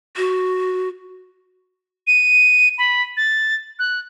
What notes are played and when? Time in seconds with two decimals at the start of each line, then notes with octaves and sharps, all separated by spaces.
0.17 F#4
2.07 D#7
2.78 B5
3.17 A6
3.79 F#6